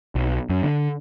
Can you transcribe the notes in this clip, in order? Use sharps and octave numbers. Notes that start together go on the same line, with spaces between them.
B1
F#2
D3